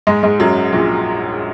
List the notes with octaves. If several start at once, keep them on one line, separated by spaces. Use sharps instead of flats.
G#2 G#3
G#2 G#3
F#2 F#3
A#1 A#2